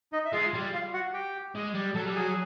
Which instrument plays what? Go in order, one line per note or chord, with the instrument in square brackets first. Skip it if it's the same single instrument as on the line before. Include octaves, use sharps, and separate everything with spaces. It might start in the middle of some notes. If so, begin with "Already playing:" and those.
[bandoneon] D#4 D#5
E5
[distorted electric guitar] G#3 [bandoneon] F4 F5
[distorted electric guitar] G3
[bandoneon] F4 F5
F#4 F#5
G4 G5
[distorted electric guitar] G#3
G3
[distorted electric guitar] F#3 [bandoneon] A4 A5
[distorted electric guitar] G3
[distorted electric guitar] F#3 [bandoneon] G#4 G#5